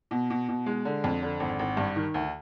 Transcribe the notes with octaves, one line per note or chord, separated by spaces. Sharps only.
B2
B2
B2
G#3
D3
F2
D3
G#1
G#1
G2
D#3
D2